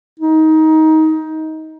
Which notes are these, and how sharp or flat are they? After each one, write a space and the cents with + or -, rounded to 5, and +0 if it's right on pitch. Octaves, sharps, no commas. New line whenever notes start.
D#4 +20